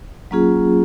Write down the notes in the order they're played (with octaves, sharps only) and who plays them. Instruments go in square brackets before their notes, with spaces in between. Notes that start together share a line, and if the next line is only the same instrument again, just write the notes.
[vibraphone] F#3 A#3 C#4 F4 G#4